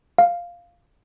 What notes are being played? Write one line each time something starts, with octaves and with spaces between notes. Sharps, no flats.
F5